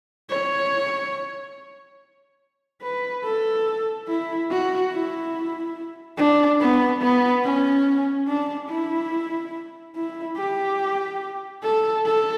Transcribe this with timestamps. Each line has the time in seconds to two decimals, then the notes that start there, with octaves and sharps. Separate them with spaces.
0.30 C#5
2.82 B4
3.24 A4
4.08 E4
4.50 F#4
4.92 E4
6.17 D4
6.60 B3
7.02 B3
7.44 C#4
8.28 D4
8.69 E4
9.95 E4
10.37 G4
11.63 A4
12.05 A4